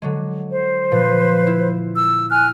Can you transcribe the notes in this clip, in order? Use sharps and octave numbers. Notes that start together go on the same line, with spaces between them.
D3 F#3 G#3
C5
A#2 F3 B4
E4
E6
G#5 F6 F#6